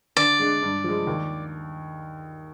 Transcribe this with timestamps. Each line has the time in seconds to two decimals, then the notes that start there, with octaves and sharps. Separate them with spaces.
0.17 D3 D5
0.39 G#3 D4
0.62 G2
0.84 F3 G#3
1.07 D#2